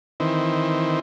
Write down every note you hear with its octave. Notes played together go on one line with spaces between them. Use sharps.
D#3 E3 C4